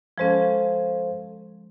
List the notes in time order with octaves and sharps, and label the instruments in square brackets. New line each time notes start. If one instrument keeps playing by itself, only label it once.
[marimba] F3 G#3 C#4 [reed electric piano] A4 C5 F5